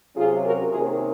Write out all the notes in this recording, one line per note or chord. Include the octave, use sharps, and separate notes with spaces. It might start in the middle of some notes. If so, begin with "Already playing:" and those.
C3 F#3 C#4 F4 G#4
F#4 A#4
C3 D#3 A#3 C#4 F4 G#4